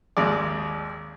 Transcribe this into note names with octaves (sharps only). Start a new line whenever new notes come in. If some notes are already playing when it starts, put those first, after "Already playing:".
G#1 D#2 G#3 D5